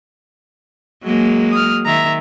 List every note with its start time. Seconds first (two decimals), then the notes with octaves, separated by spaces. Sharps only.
1.04 F#3 G#3 A#3
1.52 D#6 F6
1.86 D#3 E5 A#5